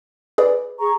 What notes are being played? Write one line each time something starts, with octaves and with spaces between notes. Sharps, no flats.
G#4 B4 D5
G#4 A#5 C#6